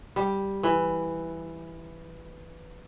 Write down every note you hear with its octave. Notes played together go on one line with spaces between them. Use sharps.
G3
E3